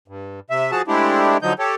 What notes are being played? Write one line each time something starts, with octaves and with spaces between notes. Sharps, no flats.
G2
C3 E5
F3 F#4 G#4 A5
G#3 A3 C4 D4 E4 G4
D3 F3 F#3 D#4 G6
G4 A4 C#5